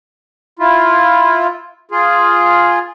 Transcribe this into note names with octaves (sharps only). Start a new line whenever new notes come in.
E4 F4
F4 G#4